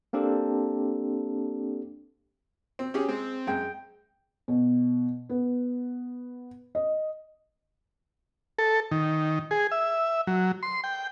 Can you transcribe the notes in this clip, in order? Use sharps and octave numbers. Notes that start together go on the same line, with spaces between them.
A#3 C4 D4 G4 A4
C4
C#4 G4 G#4
G#3 C4
F#2 G#3 G5
B2
B3
D#5
A4
D#3
G#4
E5
F#3
C6
G5